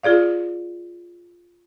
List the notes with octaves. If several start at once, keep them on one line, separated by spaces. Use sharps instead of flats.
F4 G#4 D5 F5